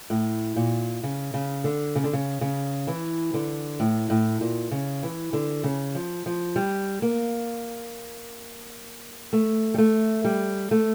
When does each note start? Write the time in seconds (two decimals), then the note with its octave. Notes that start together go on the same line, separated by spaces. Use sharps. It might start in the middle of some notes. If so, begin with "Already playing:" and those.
0.10 A2
0.56 A#2
1.03 C#3
1.34 C#3
1.64 D3
1.96 C#3
2.04 D3
2.13 C#3
2.41 C#3
2.87 E3
3.34 D3
3.80 A2
4.10 A2
4.41 A#2
4.71 C#3
5.03 E3
5.33 D3
5.64 C#3
5.95 F3
6.26 F3
6.56 G3
7.02 A#3
9.33 A3
9.74 G3
9.78 A3
10.25 G3
10.71 A3